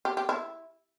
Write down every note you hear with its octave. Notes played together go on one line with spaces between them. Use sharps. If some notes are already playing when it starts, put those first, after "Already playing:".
G4
G4
E4